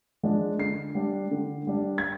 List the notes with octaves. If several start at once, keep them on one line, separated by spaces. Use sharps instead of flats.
F3 G#3 D4
D3 C7
G3 D4
D3
G3 D4
G#6